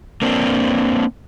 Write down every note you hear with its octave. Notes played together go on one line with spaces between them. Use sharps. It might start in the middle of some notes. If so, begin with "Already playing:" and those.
A#3 C4 D4